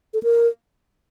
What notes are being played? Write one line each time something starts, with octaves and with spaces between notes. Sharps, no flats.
A4
A#4